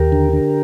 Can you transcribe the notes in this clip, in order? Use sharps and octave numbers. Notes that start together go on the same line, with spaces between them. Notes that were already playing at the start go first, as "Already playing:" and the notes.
Already playing: D#2 G4 A#4
D3
D3